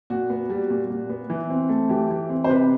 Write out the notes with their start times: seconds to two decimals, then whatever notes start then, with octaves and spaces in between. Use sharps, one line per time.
0.10 A#2 F#4
0.30 B3
0.50 G3
0.70 A#2
0.90 A#2
1.09 B3
1.30 E3
1.50 C4
1.69 A3
1.89 E3 G4
2.10 E3
2.29 C4
2.44 C5
2.49 C3 B4